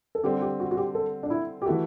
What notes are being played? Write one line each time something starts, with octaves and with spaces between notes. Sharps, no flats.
A4
D3 G3 C4 G4
G4
F#4
F#4
G4
A4
D4
E4
G4
E3 A3 E4 F#4 A4